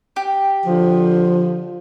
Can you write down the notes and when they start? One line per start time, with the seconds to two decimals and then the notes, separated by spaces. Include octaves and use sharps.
0.16 G4
0.65 D3 F3